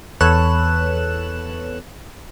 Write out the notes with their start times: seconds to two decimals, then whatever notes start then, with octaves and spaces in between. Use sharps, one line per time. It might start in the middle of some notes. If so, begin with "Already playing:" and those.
0.21 E2 A4 B4 C#5 F#6 E7